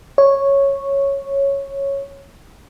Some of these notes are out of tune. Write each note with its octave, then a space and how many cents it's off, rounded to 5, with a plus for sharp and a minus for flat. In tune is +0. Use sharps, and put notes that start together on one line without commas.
C#5 -5